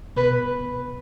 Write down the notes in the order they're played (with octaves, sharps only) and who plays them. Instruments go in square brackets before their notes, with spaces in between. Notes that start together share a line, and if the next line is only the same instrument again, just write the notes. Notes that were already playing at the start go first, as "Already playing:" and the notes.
[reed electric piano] B2 [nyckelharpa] B4